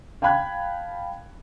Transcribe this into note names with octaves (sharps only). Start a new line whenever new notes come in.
F5 G5 A5 B5 F#6 G#6